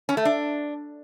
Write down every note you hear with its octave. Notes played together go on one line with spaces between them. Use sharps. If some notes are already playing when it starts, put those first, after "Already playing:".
C#4
A3
D4